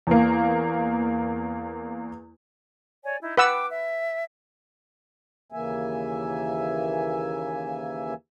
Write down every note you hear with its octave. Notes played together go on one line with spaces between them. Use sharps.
E2 A#3
C#5 D5 G#5
D#4 E4
B4 F#5 G5 D6 E6
E5
D#2 C#3 E3 A#3 E5 G#5